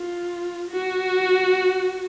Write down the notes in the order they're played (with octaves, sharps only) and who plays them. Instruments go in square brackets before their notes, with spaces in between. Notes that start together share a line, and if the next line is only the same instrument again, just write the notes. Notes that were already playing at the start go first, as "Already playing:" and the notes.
Already playing: [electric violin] F4
F#4